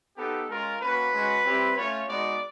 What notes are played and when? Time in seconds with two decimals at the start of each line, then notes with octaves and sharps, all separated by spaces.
0.17 B3 D#4 G4 A4
0.49 G#3 C#4 F4 A#4
0.81 A#3 C#4 F#4 B4
1.13 G#3 C#4 F#4
1.44 G3 C4 E4 G4
1.76 A3 C#4 F4 C#5
2.08 G#3 B3 D#4 F#4 D5